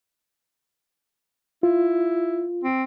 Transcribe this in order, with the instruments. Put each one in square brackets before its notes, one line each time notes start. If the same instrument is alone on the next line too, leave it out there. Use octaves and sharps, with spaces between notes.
[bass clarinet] E4 [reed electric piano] F4
[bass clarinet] C4